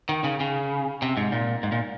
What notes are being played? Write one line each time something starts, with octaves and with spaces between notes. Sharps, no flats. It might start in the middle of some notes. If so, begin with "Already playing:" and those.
D#3
C#3
C#3
C3
G#2
A#2
G#2
A#2